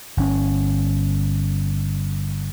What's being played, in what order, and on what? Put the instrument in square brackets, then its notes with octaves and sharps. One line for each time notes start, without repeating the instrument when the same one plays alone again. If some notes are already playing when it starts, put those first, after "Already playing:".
[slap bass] G1 C#4